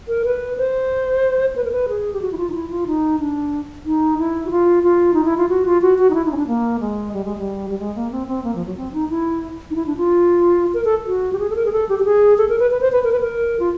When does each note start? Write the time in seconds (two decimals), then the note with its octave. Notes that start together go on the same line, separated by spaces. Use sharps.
0.08 A#4
0.25 B4
0.57 C5
1.56 B4
1.64 A#4
1.72 B4
1.89 G#4
2.13 G4
2.22 F#4
2.32 E4
2.37 F4
2.50 D#4
2.54 E4
2.70 F4
2.87 D#4
3.20 D4
3.85 D#4
4.19 E4
4.47 F#4
4.51 F4
4.83 F4
5.14 D#4
5.25 E4
5.37 F4
5.49 F#4
5.66 F4
5.82 F#4
5.99 F#4
6.10 D#4
6.15 E4
6.25 D#4
6.32 C#4
6.37 D4
6.47 A#3
6.80 G#3
7.13 G3
7.25 G#3
7.38 G3
7.70 G3
7.79 G#3
7.95 A#3
8.12 C4
8.28 C4
8.44 A#3
8.55 F3
8.66 F#3
8.77 C4
8.93 D#4
9.10 E4
9.71 D#4
9.76 E4
9.86 D4
9.97 F4
10.74 A#4
10.85 A4
11.06 F#4
11.33 G4
11.39 G#4
11.50 A4
11.56 A#4
11.66 G#4
11.72 A4
11.89 G4
11.99 G4
12.05 G#4
12.38 A4
12.49 A#4
12.60 B4
12.71 B4
12.81 C5
12.92 B4
13.04 A#4
13.12 B4
13.21 A#4
13.60 F4